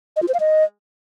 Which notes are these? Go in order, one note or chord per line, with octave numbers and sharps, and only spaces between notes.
D#5
F4
C5
F5
D#5